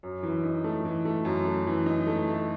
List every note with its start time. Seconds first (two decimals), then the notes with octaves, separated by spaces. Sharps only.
0.03 F#2
0.23 E3
0.43 D#4
0.64 A3
0.85 E3
1.05 A3
1.25 F#2
1.45 A3
1.67 E3
1.86 D#4
2.07 A3
2.28 A3